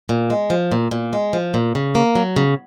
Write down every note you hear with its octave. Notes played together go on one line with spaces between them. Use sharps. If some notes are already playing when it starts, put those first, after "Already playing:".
A#2
G#3
F3
A#2
A#2
G#3
F3
A#2
C#3
A#3
F#3
C#3